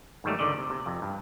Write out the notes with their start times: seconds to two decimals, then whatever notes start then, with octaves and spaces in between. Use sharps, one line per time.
0.24 G#2 D#3 F#3 G3 A3
0.39 C#2 G#2 D3 D#3 D5 D#5
0.58 C3
0.70 C3
0.86 F2 C3
1.02 G2